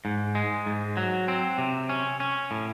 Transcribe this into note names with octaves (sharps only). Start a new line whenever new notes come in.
G#2
G#3
G#2
F#3
C4
C3
C#4
C#4
A2